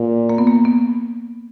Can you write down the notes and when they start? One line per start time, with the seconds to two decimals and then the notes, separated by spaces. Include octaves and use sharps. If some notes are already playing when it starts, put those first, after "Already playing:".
Already playing: A#2
0.29 A#3
0.38 B3
0.47 A#3
0.65 B3